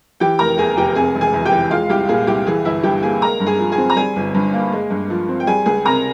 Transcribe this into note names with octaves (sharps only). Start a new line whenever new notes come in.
E3 G4 G5
F1 A#4 A#5
E2 G#4 G#5
F1 G4 G5
C3 G#4 G#5
E1
G#4 G#5
E2
G4 G5
E3
G#3 F4 F5
C2 G4
A#2 G#4
C2 G4
E3 G#4
G1 E4 E5
G2 G4 G5
A#3 G#4 G#5
G#3 A#4 A#5
G2
G#4 G#5
F3
G#4 G#5
C4
A#5
G3 G#4 G#5
G1
G2
A#3
G#3
G2
F3
C4
G5
G3 G#4 G#5
C#2 G#4 G#5
C3 A#4 A#5